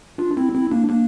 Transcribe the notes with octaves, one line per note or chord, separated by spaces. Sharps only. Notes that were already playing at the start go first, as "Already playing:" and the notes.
D4 F4
C4 E4
C4 E4
A#3 D4
A#3 D4